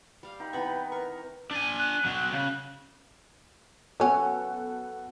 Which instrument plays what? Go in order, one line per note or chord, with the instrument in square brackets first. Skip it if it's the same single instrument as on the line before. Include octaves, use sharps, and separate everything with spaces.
[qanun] G3 F5
[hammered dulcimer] D#4 G5 B5
[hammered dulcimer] C3 B3 [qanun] E3 B5 C#6
[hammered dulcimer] A#4 [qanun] C#6
[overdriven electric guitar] D4 G#5
[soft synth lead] F#6
[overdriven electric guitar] B2 F#3
C#3
[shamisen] F#3 C#4 [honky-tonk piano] B3 F#4 A4